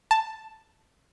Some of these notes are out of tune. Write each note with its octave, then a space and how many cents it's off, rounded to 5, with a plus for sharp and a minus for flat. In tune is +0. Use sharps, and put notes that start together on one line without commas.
A5 +5